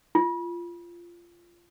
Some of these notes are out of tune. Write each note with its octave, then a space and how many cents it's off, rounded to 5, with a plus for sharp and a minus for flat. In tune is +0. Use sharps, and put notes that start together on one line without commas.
F4 -15